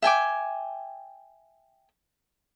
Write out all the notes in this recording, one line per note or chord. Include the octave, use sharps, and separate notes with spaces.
E5 G5 G#5 D6